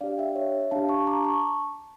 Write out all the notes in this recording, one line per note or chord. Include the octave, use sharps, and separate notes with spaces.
D4 G4 D5 F5
E5 G5
C#5 E5
D4 G4 F5 A5
A5 C#6
A#5 D6
A5 C#6